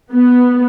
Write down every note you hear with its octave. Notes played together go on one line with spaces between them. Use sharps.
B3